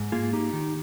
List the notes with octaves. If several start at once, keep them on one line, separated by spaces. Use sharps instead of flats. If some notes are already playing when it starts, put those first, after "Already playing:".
Already playing: G#2
A#3 F4 G#4
D#4 G4
D#3